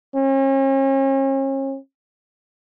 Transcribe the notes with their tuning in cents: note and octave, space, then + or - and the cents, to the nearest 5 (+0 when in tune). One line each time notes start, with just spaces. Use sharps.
C#4 -40